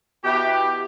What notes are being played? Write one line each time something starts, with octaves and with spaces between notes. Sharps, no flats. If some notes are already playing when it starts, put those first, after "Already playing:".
B2 B3 E4 G4